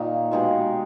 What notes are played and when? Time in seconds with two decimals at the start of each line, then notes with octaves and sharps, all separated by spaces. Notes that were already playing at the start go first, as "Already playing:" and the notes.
Already playing: A#2 D#3 A#3 D#4
0.31 B2 G#3 D#4 G4